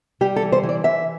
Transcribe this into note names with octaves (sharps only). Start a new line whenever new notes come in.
G3 G4
A4
E3
C5
E3
D5
E3 E5